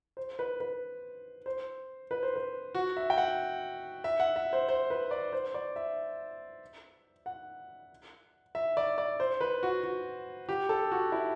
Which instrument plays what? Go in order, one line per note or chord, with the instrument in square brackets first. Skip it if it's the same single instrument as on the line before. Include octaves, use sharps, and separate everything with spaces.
[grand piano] C5
B4
B4
C5
B4
C5
B4
F#4
E5
G5
F#5
E5
F#5
E5
C5
C5
B4
D5
C5
D5
E5
F#5
E5
D5
D5
C5
B4
F#4
F#4
G4
A4
F#4
E4